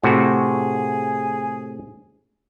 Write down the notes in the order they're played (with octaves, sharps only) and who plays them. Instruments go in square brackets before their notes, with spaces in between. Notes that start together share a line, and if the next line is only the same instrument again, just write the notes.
[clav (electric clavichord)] A2 C3 F#4 [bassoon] G#4